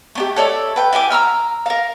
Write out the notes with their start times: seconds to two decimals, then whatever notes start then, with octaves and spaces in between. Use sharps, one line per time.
0.15 A3 D4 G4
0.36 A4 C#5 D5 E5
0.76 B4 G5
0.93 E4 G4 G#5 D6
1.10 A#5 B5 E6 F6
1.66 A#4 F5